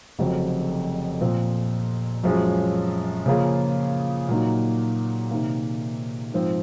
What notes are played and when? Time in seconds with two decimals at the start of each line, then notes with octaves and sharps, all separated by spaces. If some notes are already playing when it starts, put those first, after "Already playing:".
0.19 F1 F2 C#3 F#3 C4
1.21 A#2 F3 C4
2.24 F#2 F3 G#3 C#4
3.26 C#3 F3 A#3 F4 G#4
4.28 A#2 F#3 A#3 D#4
5.31 C3 D#3 A#3
6.33 G#2 F3 C4